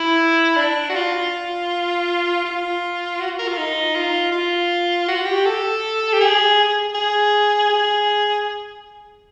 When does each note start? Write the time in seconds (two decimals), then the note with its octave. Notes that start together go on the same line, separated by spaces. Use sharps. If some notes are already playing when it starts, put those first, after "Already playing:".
Already playing: E4
0.57 D4
0.89 F#4
0.95 F4
2.45 F4
3.20 F#4
3.39 A#4
3.48 F4
3.58 D#4
3.95 F4
4.32 F4
5.08 F#4
5.26 G4
5.45 A4
6.13 G4
6.21 G#4
6.95 G#4
7.70 G#4